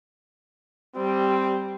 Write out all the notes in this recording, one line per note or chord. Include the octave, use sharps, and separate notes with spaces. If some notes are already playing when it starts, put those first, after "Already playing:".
G3 C4